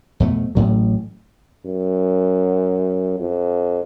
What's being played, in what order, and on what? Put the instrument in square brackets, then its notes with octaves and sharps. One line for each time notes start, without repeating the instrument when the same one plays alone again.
[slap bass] F2 B2 A3
A1 A2 F#3
[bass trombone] F#2
F2